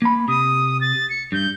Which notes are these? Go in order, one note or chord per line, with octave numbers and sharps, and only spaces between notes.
A#3 B5
C3 D#6
A6
C#7
G2 G6